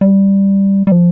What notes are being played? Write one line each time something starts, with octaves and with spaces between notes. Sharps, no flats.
G3
G3
F3